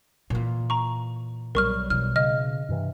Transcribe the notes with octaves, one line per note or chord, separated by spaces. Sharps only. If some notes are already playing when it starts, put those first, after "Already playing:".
A#2 E3
A#5 C#6
B1 F#3 G3 A#4 C#6 F6
B2 E3 F6
C#3 D#5 F6
G2 C3 E3